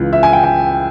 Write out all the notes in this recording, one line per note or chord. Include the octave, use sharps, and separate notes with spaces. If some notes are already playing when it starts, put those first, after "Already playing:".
Already playing: C#2 C#3 E3
E5
G#5
G5
G5